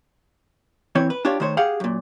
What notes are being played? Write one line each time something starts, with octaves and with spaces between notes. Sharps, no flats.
E3 C4 C#5
B4
D4 F4 G4 C#5
D#3 A3 C5 C#5
G4 G#4 F5 F#5
F#2 A#2